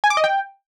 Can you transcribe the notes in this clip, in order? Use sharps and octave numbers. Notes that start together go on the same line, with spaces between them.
G#5
D6
D#5
G5